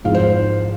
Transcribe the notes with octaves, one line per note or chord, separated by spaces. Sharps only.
G#1 G#2 F3 G#3 F5
C5